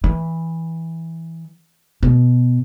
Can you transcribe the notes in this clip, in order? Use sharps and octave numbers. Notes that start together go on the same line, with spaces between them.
E3
B2